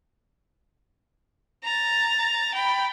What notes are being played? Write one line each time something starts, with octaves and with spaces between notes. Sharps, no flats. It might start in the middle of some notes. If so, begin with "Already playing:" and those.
A#5 A6
G5 B5